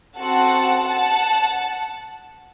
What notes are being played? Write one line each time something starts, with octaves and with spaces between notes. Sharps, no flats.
C4 F#4 A4 F#5 A5
F#5 A5